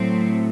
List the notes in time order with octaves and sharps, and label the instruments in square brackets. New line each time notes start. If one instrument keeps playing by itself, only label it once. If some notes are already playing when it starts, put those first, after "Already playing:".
Already playing: [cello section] A2 F#3 A3 C4